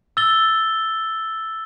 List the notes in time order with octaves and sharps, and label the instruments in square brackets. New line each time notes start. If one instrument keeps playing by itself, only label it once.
[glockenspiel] E6 A6 G7